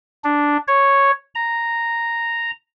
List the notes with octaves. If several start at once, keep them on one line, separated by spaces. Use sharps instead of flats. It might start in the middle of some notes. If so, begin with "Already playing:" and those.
D4
C#5
A#5